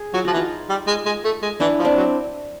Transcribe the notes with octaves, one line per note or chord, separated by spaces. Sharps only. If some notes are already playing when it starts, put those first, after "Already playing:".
Already playing: G#4
F#3 F4
F3 F#4
E3
D#4 F4
G3
G#3
G#3
A3
G#3
E3 D4 E4
F3
C4 D4
F#3